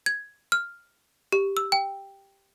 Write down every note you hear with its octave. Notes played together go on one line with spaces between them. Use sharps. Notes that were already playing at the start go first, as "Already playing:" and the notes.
G#6
F6
G4
E6
G5